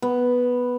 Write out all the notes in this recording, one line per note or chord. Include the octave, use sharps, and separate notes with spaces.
B3